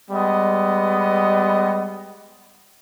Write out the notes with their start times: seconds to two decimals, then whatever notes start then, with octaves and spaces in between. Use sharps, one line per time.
0.11 G3 G#3 B3 D#5